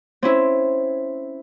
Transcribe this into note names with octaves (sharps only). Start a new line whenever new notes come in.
C4 C#4 E4